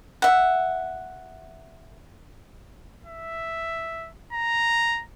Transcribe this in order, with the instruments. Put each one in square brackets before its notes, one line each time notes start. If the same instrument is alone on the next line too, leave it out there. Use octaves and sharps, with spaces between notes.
[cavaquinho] E5 F#5
[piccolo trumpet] E5
A#5